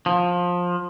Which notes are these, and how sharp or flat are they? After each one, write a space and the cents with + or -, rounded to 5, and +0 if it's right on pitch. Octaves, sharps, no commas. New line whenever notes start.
F3 +20